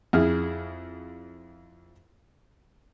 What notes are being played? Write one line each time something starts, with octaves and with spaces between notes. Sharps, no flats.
F2 E4 G#4 F6